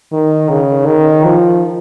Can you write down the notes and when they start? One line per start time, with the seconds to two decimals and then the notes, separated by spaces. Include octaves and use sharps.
0.12 D#3
0.50 C#3
0.87 D#3
1.24 F3